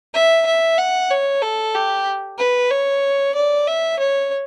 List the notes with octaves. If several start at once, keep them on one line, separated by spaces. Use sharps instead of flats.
E5
E5
F#5
C#5
A4
G4
B4
C#5
D5
E5
C#5